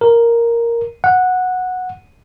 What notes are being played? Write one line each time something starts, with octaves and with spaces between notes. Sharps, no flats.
A#4
F#5